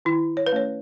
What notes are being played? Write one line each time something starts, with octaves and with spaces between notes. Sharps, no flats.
D#3 E4
C#5
B4
A3 C#4 C#5